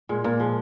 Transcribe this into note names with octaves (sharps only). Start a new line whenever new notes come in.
A#2 G#3
A#2 A#3
F3 G#3